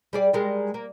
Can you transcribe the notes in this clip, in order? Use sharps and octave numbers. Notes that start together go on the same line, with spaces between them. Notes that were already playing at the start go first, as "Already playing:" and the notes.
G3 G#4 D5
G3 G#3 A#4
A#3